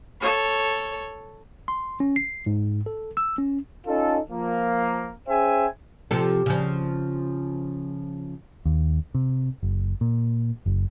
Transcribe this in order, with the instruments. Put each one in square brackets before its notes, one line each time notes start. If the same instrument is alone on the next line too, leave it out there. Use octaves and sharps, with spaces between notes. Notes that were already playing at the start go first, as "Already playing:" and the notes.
[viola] A4 C#5
[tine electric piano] C6
C#4
C7
G#2
A4
E6
C#4
[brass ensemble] C#4 D#4 F4 A4
F3 A#3
C#4 G#4 C5 E5 G5 G#5
[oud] C3 F3 A4
C#3 F3
[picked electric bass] D#2
C3
F#1
A#2
F#1